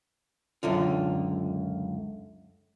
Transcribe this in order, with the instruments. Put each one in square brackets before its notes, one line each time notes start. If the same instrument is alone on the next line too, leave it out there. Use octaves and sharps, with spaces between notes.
[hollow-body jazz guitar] C#2 F#2 D3 F4